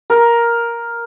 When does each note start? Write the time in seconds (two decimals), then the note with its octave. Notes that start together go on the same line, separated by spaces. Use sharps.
0.10 A#4